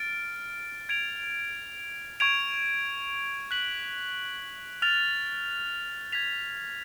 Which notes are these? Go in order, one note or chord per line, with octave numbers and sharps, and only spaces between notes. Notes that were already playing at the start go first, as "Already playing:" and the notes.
Already playing: F6 A6 D7
G#6 D7 F7
C#6 G#6 D7 F7
F#6 B6 F#7
F6 A6 F7
G#6 B6 F7